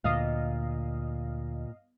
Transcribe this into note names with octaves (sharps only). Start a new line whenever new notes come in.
D2 A#2 D#5 F5